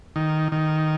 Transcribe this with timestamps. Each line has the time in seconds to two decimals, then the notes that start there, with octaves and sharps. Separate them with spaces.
0.16 D#3
0.52 D#3